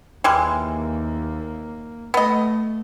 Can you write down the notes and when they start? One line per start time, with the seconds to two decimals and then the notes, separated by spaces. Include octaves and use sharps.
0.24 D#2 E3 G3 G#3 A#3
2.14 A3 B3 D#5